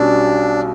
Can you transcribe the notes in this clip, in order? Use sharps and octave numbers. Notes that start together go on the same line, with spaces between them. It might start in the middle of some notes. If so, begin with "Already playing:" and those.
Already playing: B1 B2 G3 C#4 D4